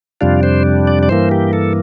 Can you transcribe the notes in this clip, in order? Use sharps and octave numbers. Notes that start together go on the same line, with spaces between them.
F2 C3 G3 D4 F4
C5
D5
D5
G2 E3 A#3 C5
G4
A4